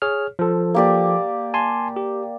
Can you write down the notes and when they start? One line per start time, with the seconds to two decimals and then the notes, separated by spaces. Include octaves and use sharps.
0.02 G#4 C#5 F6
0.39 F3 A4
0.75 A#3 G4 D5
1.54 G#5 A5 C6
1.96 G4